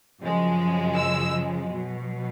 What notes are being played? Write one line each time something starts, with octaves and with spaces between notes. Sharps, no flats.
F#2 C#3 F3 G#3
E6
B2 F#3